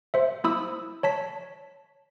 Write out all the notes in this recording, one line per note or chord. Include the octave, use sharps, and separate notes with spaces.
C5 E5
A#3 E4 B5 D#6 E6
C#5 A5 B6